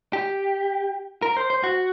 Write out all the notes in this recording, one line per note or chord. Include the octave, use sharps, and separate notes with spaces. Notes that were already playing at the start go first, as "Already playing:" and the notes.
G4
A#4
C5
C5
F#4